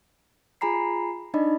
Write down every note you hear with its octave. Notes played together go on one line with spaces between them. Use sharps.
F4 G#4 G#5 A#5 B5 C7
D4 D#4 D5 D#5 B5